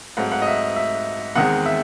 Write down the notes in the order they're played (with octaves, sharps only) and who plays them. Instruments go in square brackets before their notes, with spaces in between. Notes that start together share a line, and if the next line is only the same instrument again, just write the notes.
[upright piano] G#2 F#3 A3 C4 F#5
F#5
D#5
E5
E5
E2 D#3 G#3 C4 F#5
E5